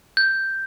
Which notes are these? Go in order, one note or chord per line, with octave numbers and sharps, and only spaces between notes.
G6